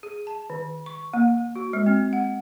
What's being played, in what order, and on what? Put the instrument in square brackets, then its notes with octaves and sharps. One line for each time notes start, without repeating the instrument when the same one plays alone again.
[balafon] G#4
A5
D#3
C#6
A#3
F#4
G#3
C4
F#5